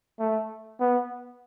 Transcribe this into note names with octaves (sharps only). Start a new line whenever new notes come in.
A3
B3